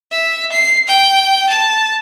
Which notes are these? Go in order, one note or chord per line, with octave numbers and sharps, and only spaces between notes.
E5
C7
G5
A5